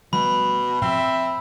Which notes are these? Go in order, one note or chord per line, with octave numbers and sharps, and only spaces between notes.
B2 F3 G3 A3 B5
A2 F3 C4 E5